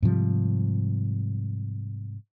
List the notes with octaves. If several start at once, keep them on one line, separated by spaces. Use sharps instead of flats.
G#2 C3 F3 G3